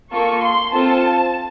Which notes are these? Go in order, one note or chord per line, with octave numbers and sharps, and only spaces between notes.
A#3 F4 A4 C#6
C6
C4 F4 A4 A5